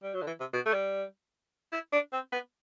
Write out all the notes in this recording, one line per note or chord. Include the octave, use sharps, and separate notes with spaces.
G3
F#3
D3
E3
C3
B2
A3
G3
E4
D4
C4
B3